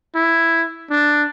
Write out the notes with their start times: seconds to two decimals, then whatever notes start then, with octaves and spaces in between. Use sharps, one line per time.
0.15 E4
0.91 D4